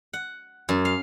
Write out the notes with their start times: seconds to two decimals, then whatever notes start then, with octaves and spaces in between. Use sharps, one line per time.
0.13 F#5
0.69 F#2
0.85 F5